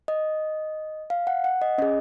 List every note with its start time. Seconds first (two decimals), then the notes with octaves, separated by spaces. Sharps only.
0.08 D#5
1.10 F5
1.27 F#5
1.44 F#5
1.62 D#5
1.78 C#4 G#4 D#5